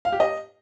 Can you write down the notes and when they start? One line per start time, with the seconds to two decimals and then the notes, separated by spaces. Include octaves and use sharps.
0.05 F5
0.12 G4
0.20 D#5